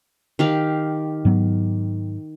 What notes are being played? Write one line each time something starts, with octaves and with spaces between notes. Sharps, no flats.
D#3 G4 F5
G#2 F#3 B3